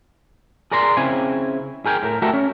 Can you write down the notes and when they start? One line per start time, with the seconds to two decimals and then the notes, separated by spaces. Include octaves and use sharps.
0.72 G#4 A#4 D5 A#5 C6
0.97 C#3 C4 E4 G#5
1.86 G#4 A#4 G5 G#5
2.03 A2 A#4
2.22 A3 F#4 G4 A4 A#4 E5
2.34 C#4